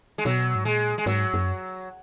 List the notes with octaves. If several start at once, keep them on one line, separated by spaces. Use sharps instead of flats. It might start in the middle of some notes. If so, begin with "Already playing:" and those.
G#3
B2 F#3
G#2
A#2 G#3
G#3
G#2 F#3
F#2